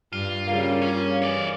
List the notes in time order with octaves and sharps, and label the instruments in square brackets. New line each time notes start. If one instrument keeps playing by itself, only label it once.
[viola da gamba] G2 [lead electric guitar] F4
[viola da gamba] C#3 G3 [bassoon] A#3
[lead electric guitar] C#4
[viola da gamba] E3 [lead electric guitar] C#5 D5